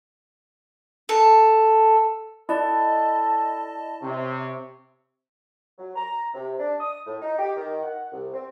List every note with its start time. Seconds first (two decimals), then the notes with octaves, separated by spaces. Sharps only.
1.09 A4
2.49 E4 A4 D5 D#5 A5
4.02 C3 C4 C#5 E5
5.78 F#3
5.96 A#5
6.34 C3
6.59 D4
6.80 D#6
7.06 A2
7.22 D#4
7.38 G4
7.56 D#3
7.83 F#5
8.12 C2
8.33 C4